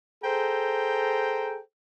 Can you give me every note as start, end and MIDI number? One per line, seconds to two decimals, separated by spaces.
0.24 1.58 68
0.24 1.58 69
0.24 1.58 72
0.24 1.58 79
0.24 1.58 82